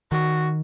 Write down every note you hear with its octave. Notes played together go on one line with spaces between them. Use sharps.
D#3 F#4